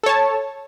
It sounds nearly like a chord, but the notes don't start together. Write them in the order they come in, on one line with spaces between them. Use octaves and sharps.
A4 C#5 A5